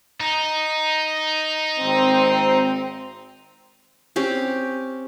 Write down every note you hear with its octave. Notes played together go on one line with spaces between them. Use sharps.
D#4
G#1 C4
C4 C#4 G4